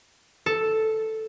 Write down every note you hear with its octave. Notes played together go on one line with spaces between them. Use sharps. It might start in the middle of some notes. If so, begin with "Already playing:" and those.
A4